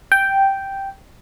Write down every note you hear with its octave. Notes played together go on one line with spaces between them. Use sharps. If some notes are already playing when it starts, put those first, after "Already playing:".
G5